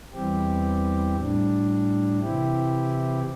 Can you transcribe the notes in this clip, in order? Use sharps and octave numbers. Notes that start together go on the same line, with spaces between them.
E2 E3 G3 C4 G4
A2 G3 D4
C3 E3 C4 E4 G4